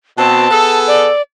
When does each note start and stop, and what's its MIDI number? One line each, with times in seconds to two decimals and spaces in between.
0.18 0.49 47
0.18 0.49 60
0.18 0.79 81
0.50 1.11 59
0.50 1.11 68
0.50 1.11 69
0.87 1.22 74